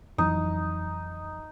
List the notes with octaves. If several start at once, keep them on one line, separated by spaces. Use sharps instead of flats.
F2 E3 F#3 D#4